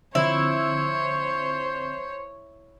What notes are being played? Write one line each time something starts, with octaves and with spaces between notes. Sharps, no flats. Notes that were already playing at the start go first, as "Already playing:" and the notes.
D3 F3 C4 E4 C5 C#5